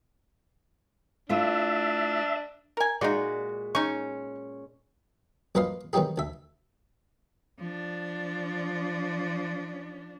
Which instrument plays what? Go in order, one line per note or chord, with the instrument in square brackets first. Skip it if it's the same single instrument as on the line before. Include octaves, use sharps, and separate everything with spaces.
[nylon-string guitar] A3 E4 F4 [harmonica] D4 [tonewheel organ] E5
[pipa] A#4 G#5
[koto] A#2 G#3 F#4 [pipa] D#4 F4 D5
[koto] C#4 [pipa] D#4 C#6
[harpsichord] A#1 F#2 B4 D#5 F5 C6
B2 D#3 F#3 D#4 G4 G#4
D2 E5
[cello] F3 D4